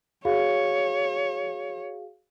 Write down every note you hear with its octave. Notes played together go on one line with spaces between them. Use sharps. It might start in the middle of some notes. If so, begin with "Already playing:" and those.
F#4 G#4 C#5 F5